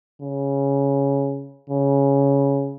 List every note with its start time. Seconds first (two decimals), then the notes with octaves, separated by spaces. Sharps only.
0.22 C#3
1.70 C#3